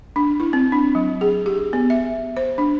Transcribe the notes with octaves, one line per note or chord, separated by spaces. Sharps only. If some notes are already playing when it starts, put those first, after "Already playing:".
D4
E4
C4
D4
F#3
G#4
G4
B3
E5
C5
D4